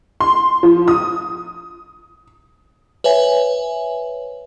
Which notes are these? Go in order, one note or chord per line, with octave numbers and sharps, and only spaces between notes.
C6
F3
D#6
B4 C#5 E5 G#5